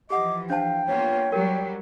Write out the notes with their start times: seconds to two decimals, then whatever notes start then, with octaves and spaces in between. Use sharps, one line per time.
0.10 E3 F3 G4 D#5 F#5 D6
0.50 D4 C5 F5 G5 A5
0.87 A#3 B3 F4 C#5
1.32 F#3 G3 G4 A#4 G5